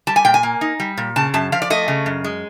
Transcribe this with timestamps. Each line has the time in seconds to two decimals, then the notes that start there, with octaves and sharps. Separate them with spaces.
0.07 G3 A5
0.16 G#5
0.25 A#2 G5
0.34 G#5
0.43 A#3
0.61 D#4
0.80 G3
0.98 A#2
1.16 C#3 A5
1.34 F#2 A5
1.52 F3 F5
1.62 D5
1.70 A3 D#5
1.88 C#3
2.06 F#2
2.24 G#3